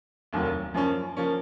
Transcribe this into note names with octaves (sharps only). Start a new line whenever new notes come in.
F1 D#2 D#3 F#3 A#3
F#2 F3 A#3 C#4
F3 A#3 C#4